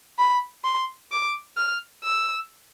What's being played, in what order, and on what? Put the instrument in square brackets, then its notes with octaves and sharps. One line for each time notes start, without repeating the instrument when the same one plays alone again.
[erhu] B5
C6
D6
F6
E6